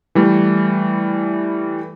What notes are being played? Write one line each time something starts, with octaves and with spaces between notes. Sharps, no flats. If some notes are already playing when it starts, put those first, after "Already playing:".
E3 G3 A3